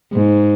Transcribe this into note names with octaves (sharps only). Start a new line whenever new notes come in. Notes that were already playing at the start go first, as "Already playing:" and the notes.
G#2